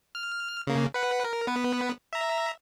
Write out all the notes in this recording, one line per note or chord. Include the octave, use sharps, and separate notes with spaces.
F6
C#3 A#3
B4 F#5
A#4
B3 B4
E5 A#5